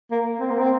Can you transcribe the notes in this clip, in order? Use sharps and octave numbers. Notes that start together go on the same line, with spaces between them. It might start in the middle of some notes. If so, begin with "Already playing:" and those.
A#3
C4
A#3
C4